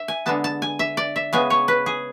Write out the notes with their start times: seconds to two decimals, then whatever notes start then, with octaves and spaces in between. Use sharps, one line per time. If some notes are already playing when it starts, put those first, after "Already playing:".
Already playing: E5
0.08 G#5
0.26 D3 G#3 B3 A5
0.44 A5
0.62 G#5
0.79 E5
0.97 D5
1.16 E5
1.33 C#3 G#3 B3 G#5
1.50 C#5
1.68 B4
1.86 G#4